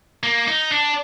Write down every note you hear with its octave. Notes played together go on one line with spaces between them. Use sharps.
A#3
D#4
D4